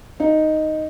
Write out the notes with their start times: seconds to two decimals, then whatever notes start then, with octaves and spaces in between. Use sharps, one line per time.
0.20 D#4